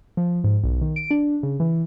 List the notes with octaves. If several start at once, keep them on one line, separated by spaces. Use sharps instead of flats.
F3
G#2
B1
D#3
D7
D4
C#3
E3